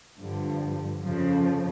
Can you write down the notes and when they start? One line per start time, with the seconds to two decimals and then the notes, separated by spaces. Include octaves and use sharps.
0.20 G2 D3 F3
1.02 F2 C#3 F3